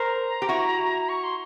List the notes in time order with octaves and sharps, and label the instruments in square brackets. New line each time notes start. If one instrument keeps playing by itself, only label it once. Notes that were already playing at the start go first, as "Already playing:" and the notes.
Already playing: [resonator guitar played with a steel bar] A#4 C5 [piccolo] A#5
[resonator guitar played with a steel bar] G4
E4 F#4
[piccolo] C#6
C6